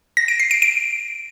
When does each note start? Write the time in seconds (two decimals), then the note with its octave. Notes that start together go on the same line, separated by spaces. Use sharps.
0.17 A#6
0.28 D7
0.40 C7
0.51 D7
0.62 D7